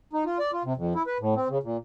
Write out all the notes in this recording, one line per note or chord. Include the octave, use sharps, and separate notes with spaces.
D#4
F4
D5
F4
C3
F2
E4
B4
A2
C4
C#3
A#2